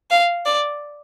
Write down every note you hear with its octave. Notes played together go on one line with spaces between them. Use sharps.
F5
D5